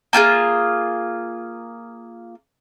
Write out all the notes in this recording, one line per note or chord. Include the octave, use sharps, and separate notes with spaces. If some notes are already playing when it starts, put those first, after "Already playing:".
A#3 F4 G4 G#4